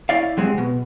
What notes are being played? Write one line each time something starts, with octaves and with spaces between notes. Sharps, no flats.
E4 C#5 D5 F5
C3 F#3 G#3 C4
B2